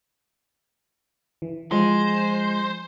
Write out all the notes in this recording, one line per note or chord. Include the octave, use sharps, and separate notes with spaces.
E3
F3 G#3 C5